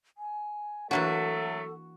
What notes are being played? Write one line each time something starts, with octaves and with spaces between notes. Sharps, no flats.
G#5
E3 F#3 A3 A#3 D4 F#4 A4